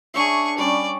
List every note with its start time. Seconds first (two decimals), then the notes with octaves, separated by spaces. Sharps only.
0.14 D4 G#4 C#5 E5 C#6
0.58 G3 C#4 D5